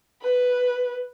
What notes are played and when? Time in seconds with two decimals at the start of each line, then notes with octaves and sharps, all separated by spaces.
0.22 B4